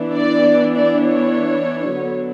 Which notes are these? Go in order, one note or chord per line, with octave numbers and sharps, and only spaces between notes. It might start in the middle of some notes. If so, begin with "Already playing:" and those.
Already playing: E3 B3 D4
D5
D5
C#5
D3 F#3 B3 D4